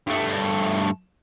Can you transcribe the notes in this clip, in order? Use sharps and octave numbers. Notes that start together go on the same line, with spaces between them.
G2 A3